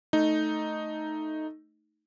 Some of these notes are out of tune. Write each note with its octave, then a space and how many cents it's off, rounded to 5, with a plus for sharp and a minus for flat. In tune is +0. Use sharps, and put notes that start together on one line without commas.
A3 +0 D#4 +0